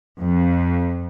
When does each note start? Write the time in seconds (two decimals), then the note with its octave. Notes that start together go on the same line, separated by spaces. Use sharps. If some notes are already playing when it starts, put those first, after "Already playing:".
0.20 F2